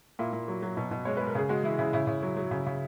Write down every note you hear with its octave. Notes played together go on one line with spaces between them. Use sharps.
A#2 E4
A#2
F#3
F#3
B2
B2
G#3 C#5
G#3 B4
A#4
C#3 G#4
G#3 F#4
E3 E4
C#3 E4
C#3 E4
C#3
F#3
F#3
C#3
C#3